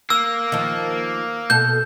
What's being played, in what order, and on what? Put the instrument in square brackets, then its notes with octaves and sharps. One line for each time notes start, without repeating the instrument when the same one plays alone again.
[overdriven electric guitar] A#3 [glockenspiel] E6
[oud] D#3 F3
[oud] B2 A4 [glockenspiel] G6